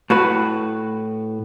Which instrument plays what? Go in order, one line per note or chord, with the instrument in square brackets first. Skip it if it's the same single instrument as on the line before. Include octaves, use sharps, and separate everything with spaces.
[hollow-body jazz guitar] A2 F#4 B4